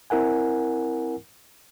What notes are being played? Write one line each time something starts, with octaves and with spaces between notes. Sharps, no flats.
C4 E4 A#4 F#5 G#5